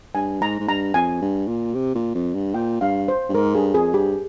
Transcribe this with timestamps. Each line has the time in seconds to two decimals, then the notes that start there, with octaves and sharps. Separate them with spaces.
0.15 G2 G#5
0.41 G#2 A#5
0.60 G#2
0.68 G2 A#5
0.94 F2 G#5
1.22 G2
1.48 A#2
1.74 C3
1.95 A#2
2.15 F2
2.34 G2
2.54 A#2 G5
2.81 G2 F5
3.08 C5
3.29 G2
3.34 G#2 A#4
3.55 G2 G#4
3.74 F2 G#4
3.94 G2 G4